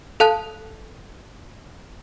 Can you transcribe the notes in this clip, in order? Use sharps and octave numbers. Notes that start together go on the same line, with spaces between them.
A4 F5 A5 F#6